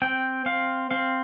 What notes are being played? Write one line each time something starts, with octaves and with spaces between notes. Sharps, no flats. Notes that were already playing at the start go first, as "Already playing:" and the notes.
C4 G5
C4 F5
C4 F5